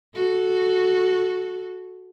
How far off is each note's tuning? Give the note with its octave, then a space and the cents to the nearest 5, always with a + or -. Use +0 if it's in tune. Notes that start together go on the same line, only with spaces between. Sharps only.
F#4 -5 A4 -15